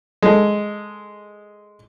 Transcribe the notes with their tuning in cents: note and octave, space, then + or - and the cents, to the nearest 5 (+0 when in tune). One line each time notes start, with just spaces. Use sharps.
G#3 +0 A4 +0